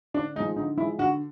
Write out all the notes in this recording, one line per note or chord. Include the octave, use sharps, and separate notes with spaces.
D3 D4
F3 G#3 D#4
D3 D#4
F3 G#3 E4
D3 F#4